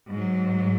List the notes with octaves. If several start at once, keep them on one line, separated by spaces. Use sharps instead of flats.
G#2 F#3